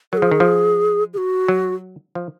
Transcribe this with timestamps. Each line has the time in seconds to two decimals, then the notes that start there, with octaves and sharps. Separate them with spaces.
0.13 F#3 A#4
0.17 F3 G#4
0.31 D#3
0.40 F3
1.14 G#4
1.18 F#4
1.48 F#3
2.15 F3